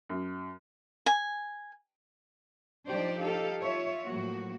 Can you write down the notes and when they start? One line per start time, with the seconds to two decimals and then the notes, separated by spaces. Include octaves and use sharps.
0.09 F#2
1.06 G#5
2.87 F3 D4 D#4 G4 C5 D5
3.21 D#4 G4 A4 F5
3.61 F4 C#5 E5
4.05 A2 F3 F#3 A#3 F#4